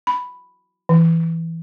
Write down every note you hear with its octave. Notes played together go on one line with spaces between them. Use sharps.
B5
E3